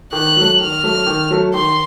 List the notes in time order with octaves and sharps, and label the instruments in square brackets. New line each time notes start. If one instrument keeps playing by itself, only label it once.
[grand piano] D#3 [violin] F#6
[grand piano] F#3 A3
[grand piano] D#3 [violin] F6
[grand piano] F#3 A3
D#3
F#3 A3
[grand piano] D#3 [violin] C6